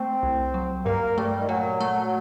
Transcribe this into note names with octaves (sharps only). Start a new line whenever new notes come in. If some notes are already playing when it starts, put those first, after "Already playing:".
Already playing: A3 C4
C2
F#3
G2 A#3
G3 A3
D#3
A#2 F#3
A3